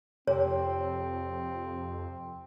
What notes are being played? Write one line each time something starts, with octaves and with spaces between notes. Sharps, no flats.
F2 C3 C4 G4 C#5